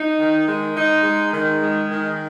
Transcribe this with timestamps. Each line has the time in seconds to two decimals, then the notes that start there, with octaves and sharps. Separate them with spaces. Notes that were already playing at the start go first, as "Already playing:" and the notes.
Already playing: D#4
0.19 D#3
0.47 G#3
0.76 D#4
1.04 G#3
1.33 D#3
1.62 G#3
1.89 D#3